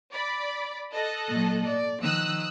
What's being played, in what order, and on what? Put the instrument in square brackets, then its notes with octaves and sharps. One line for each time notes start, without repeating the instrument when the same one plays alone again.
[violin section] D5 B5
A4 D#5 F#6
[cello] A#2 F#3
D5
[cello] D#3 F3 [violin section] D#6 E6 F#6